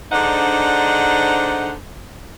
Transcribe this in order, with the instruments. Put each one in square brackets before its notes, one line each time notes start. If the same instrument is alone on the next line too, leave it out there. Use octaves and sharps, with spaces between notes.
[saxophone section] G#2 D3 D4 D#4 C5 F#5